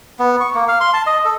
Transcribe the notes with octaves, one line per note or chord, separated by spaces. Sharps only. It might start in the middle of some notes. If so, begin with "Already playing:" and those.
B3
C#6
A#3
F5
C6
A5
D#5
A4